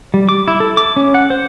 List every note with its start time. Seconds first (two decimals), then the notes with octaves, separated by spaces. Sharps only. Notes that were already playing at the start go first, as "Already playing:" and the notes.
0.14 G3
0.29 D6
0.48 E4
0.60 A4
0.77 D6
0.97 C#4
1.14 F#5
1.30 C5